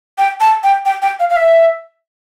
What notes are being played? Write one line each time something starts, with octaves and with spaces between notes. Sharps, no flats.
G5
A5
G5
G5
G5
F5
F5
E5